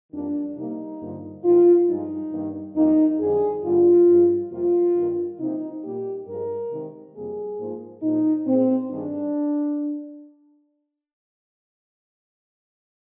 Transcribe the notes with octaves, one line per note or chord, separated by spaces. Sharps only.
F2 D#3 G3 A#3 D4
C3 G3 A#3 D#4
G2 D3 F3 A#3
G#2 D#3 A#3 F4
G2 F3 G#3 D#4
G2 D#3 A#3
F2 D#3 G3 A#3 D#4
F2 D3 G3 G#4
G2 D3 G3 A#3 F4
G2 F3 G#3
F2 C3 G3 A#3 F4
G2 D#3 A#3
C3 F3 A#3 D#4
A#2 G3 A#3 G4
G2 F3 G#3 A#4
C3 D#3 G#3
F2 C3 G3 A#3 G#4
G#2 F3 A#3
A#2 F3 G#3 D#4
A#2 G#3 C4
G2 D#3 G#3 D4